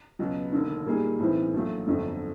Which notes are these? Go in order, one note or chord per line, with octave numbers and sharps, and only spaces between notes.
C#2 B2 F#3
E1 D#2 D3
A#2 G3 A#3 D#4 G#4
B1 A2 E3 G#3 C4
A#1 A#2 F#3 A3
G1 F2 D3 F#3 A3